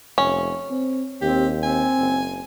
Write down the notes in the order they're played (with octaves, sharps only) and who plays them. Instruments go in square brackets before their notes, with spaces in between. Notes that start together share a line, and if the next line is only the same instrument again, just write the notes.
[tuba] F1 [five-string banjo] C#4
[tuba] C4
[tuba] D#2 [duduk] C4 [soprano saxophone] G4
[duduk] C4 [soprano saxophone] G#5
[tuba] F#1